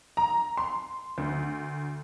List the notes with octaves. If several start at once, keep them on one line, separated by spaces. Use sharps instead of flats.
A#5
C6
D2